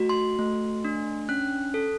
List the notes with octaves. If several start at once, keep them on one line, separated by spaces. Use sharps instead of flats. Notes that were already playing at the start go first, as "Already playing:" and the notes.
Already playing: A3 F#4
C6
A3
D4
C#4 F#6
A4